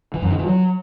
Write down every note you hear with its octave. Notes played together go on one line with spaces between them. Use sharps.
E3
F#2
D#3
E3
F#3